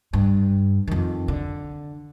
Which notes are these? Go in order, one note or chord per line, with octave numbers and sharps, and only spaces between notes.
G2
F2 D#3
D3